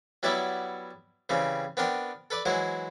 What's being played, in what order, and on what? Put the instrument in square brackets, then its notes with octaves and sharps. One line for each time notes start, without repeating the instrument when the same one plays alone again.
[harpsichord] F#3 G3 B3 E4 D5 E5
C#3 E3 G3 C4
B3 C4 D4 A#4 G5
A4 B4 D5
E3 F#3 G#3 E4 C5